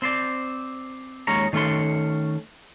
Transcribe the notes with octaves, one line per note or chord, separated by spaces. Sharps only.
C4 C5 D5
D#2 G#3 C#4 C#5 A#5
D#3 A3 C#4 A4 C6